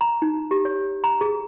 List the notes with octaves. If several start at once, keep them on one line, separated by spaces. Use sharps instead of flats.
A#5
D#4
G4
C#5
A#5
G#4